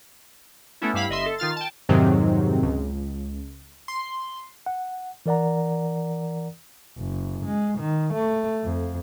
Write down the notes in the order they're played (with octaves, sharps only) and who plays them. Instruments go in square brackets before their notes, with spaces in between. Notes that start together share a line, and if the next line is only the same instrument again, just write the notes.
[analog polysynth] A3 B3 C#4 E4
G2 G3 E4 F5 B5
G1 D#5 E5 C6
A4
D#3 F4 F6 A6
G5 A5
[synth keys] F2 G#2 C3 D#3 F#3 C4
C#2
C6
[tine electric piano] F#5
E3 A#4 D5 F#5 A#5
[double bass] F#1
G#3
D#3
A3
F2